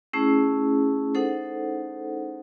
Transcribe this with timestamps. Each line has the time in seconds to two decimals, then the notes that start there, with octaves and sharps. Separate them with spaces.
0.13 A3 C#4 E4 G#4
1.15 D#4 A4 C5 F#5